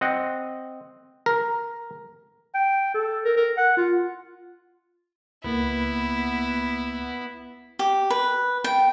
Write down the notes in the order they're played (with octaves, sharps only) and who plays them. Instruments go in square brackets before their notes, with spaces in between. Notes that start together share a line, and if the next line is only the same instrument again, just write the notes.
[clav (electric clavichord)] C4 D#5 F#5
A#4
[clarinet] G5
A4
A#4
A#4
F#5
F4
[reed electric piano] C#2 A#3 [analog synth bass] B3 [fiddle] E4
[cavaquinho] G4
B4
G5